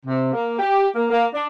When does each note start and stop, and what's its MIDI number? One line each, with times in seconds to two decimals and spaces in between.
0.06 0.33 48
0.33 0.57 58
0.59 0.87 67
0.96 1.06 58
1.11 1.25 58
1.33 1.47 62